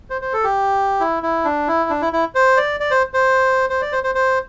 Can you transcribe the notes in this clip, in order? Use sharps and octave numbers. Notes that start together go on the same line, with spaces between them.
C5
C5
A4
G4
E4
E4
D4
E4
D4
E4
E4
C5
D5
D5
C5
C5
C5
D5
C5
C5
C5